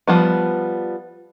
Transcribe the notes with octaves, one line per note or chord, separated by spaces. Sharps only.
F3 G3 B3